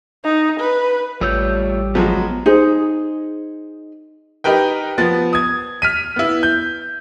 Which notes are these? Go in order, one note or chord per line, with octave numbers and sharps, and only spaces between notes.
D#4
B4
A1 G3 A3 F4 C#5 E6 G6
F3 F#3 G#3 B3
D#4 G#4 C5
D#4 G4 A#4 B4 G5
F3 B3 A6
D#6 G#6
F6 B6 D#7
B3 E4
G6